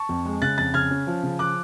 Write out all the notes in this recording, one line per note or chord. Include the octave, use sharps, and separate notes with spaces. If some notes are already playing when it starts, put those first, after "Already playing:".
Already playing: A5 C#6
F2
G#3
C#3 F#6 A6
F2 F#6 A6
C#3 F6 G#6
C#4
F3
C#3
F3 D6 F#6